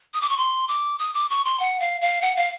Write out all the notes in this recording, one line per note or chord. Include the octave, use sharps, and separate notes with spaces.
D#6
D6
C#6
C6
D6
D#6
D6
C#6
C6
F#5
F5
F5
F#5
F5